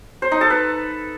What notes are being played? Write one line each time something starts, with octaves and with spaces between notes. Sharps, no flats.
C5
D#4
A4
B4